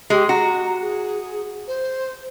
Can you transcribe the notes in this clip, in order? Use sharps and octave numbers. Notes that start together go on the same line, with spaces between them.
G#3 G4
F#4 A#5
G#4
C5